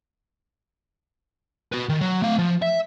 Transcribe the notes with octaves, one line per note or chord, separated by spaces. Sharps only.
F#4 B4
D#3
F#3
A3 F5
F3
E5